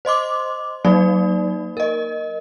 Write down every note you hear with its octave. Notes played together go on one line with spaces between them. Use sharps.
C5 D#5 C6 D6
F#3 A#3 D#4 D5
A#4 D#5